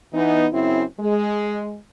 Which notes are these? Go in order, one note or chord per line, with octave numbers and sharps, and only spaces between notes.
E3 B3 D#4
F#2 C#3 C4 E4
G#3